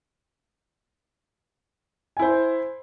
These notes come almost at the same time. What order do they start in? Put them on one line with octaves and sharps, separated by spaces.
G#5 E4 C5